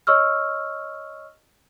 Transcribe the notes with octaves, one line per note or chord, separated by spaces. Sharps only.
C#5 D#5 C#6 E6 F6